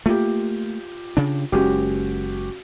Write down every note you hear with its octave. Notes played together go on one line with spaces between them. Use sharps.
A3 A#3 F4 G4
C#3 D4
F#1 G#3 C#4 F#4 G4